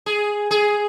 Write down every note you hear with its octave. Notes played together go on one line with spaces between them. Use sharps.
G#4
G#4